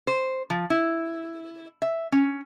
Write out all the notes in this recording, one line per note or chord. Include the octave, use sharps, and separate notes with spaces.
C5
F3
E4
E5
C#4